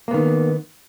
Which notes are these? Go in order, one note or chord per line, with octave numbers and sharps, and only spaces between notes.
D#3 A#3 B3